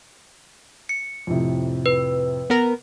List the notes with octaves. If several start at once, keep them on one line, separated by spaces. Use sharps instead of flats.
C#7
F2 A2 C3
B4
B3 A#4